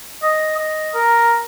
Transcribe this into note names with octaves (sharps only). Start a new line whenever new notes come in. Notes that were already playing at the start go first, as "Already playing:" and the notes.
D#5
D#5
A#4